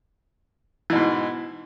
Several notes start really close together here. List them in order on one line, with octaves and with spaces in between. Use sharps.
E3 B2 G#2